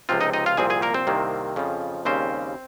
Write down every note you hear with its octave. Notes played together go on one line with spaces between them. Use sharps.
C#2 C3 F3 C4 F4
D#4 D#5
D#4 D#5
F4 F5
C2 A#2 F3 C4 G#4 G#5
G#4 G#5
A#3 A#4
C4 C5
C2 C3 D#3 A#3
F2 C#3 F3
D#2 C#3 G3 C4 C#4 C5